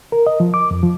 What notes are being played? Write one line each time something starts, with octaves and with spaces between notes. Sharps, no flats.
A#4
D#5
F3
D6
F2
F3